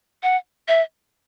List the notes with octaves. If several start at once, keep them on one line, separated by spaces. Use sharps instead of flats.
F#5
E5